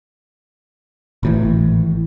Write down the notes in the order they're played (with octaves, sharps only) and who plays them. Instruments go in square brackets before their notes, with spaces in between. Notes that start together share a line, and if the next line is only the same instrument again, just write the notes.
[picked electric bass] G#1 A2 E3